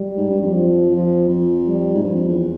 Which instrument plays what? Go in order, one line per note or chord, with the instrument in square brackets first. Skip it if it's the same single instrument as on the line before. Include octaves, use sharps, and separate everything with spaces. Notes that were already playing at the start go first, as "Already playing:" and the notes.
Already playing: [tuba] G3
[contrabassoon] G#2
G2
F2
[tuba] F3
F3
[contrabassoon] F2 [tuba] F3
[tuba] G3
[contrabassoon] G#2
[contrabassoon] G2 [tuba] F3
[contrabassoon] F2
E2